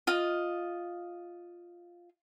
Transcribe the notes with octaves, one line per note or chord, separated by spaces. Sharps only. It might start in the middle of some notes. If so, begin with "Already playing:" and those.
F4 D#5